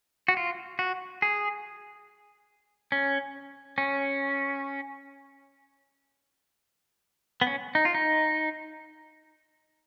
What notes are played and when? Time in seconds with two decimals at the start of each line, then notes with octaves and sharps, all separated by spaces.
0.28 F#4
0.37 F4
0.79 F#4
1.22 G#4
2.92 C#4
3.78 C#4
7.41 B3
7.47 C#4
7.75 D#4
7.85 F4
7.95 D#4